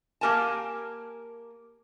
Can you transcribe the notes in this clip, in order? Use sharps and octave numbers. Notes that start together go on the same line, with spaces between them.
A#3 G4 A#4 G#5 A5